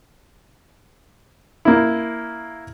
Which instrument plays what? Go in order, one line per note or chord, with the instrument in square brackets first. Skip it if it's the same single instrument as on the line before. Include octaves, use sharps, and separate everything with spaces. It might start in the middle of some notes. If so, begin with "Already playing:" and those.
[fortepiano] A#3 E4